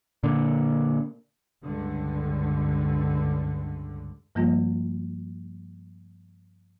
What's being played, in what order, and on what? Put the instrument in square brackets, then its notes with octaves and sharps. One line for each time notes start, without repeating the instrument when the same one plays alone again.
[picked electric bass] A#2 D3
[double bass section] C#2 G2 D3
[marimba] G2 F3 G3 A3 A#3 F4